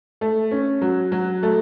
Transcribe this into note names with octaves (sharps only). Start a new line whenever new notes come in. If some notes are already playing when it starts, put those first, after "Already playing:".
A3
C#4
F#3
F#3
A3